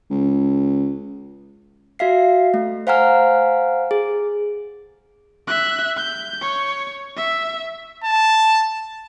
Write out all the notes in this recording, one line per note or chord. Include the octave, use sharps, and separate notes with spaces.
C#2
F#4 E5 F5 C7
A3
C5 F5 F#5 G#5 A#5 F6
G#4
E5 F#6
G6
C#5
E5
A5